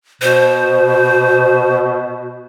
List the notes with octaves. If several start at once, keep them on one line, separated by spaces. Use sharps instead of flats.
B2 C5